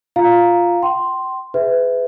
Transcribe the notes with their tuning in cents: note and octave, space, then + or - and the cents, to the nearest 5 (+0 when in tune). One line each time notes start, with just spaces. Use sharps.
F4 +0 F5 +0 A#5 +0
G5 -35 C6 +0
G#4 +0 B4 +30 E5 +0